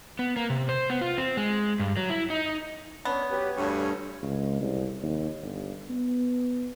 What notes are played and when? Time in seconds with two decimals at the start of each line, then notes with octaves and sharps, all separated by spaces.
0.19 B3
0.36 A#3
0.50 C3
0.69 C5
0.90 B3
1.01 F4
1.18 C4
1.37 G#3
1.79 G2
1.97 F#3
2.10 E4
2.30 D#4
3.05 B3 C#4 D4 C#5
3.30 F#3 G4 B4
3.57 D2 G2 G#5 C#6
4.23 C#2
4.61 C2
5.03 D#2
5.42 G1
5.89 B3